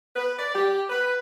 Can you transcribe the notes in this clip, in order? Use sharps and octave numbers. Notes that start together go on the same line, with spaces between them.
B4
D5
G4
B4